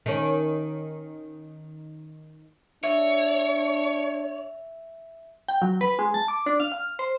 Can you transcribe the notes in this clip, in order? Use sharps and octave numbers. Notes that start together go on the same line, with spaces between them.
D#3 C#4
D4 C#5 E5
G5
F#3
B4
G#3
A5
D6
D4
F5
F6
C5